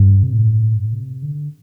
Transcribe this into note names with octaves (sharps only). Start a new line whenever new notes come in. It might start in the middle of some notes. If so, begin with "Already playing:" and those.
Already playing: G2
C3
A2
G2
A2
C3
D3